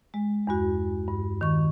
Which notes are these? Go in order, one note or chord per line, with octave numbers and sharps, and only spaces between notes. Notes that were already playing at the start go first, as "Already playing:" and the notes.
G#3
E2 G2 F#4
G2
D#3 C#6